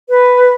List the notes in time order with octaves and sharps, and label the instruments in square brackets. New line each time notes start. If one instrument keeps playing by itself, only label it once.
[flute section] B4